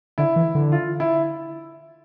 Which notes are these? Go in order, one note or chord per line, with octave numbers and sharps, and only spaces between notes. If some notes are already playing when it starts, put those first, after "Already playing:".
D3 E4
E3
D3
F4
E4